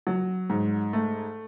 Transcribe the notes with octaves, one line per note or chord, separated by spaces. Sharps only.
F#3
G#2
A3